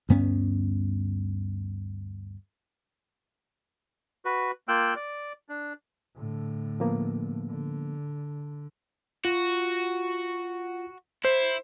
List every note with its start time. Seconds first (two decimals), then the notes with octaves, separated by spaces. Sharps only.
0.09 D2 G2 B3 C#4
4.25 F#4 B4
4.68 A#3 F4 G5 E6 F#6
4.96 D5
5.49 D4
6.16 A2 D3
6.80 F3 A#3 B3
7.49 D3
9.25 F4 F#4
11.25 E4 C5